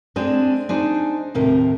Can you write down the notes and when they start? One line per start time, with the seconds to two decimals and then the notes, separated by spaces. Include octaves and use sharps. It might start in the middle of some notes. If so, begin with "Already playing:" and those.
0.16 G#3 C4 D4
0.69 D4 D#4 G#4 C5
1.35 D#2 A2 C3 A#4